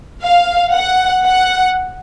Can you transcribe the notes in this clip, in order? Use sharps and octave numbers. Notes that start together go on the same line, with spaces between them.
F5
F#5
F#5